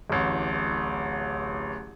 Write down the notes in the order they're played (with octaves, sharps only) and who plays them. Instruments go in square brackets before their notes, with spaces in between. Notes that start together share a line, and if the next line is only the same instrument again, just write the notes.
[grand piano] D1 A1